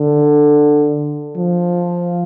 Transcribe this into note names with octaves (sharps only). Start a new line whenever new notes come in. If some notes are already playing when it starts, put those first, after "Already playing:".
Already playing: D3
F3